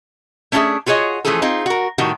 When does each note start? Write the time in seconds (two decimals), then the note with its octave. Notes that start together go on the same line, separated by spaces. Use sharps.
0.52 A3 C#4 D4 F4 G#4 E5
0.86 F4 F#4 G#4 C#5 D#5
1.25 E3 F3 A3 C#4 G#4 A4
1.42 C4 D#4 F4 G#4
1.66 F#4 A#4
1.98 A2 D#3 G3 F#4